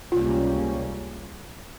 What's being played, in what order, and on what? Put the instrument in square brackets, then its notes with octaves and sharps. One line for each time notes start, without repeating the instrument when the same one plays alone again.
[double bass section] C#2 C3 G3 A#3 C#4 [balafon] F4